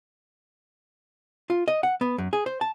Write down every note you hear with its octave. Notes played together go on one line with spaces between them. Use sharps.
F4
D#5
F#5
B3
F#2
G#4
C5
A5